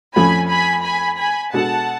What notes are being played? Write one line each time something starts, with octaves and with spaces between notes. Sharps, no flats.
F2 F3 A3 C#4 G#5 B5
G#5 B5
G#5 B5
G#5 B5
B2 G#3 D4 F#4 A4 F#5 A5